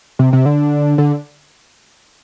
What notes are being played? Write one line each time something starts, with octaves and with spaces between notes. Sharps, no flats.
C3
C3
D3
D3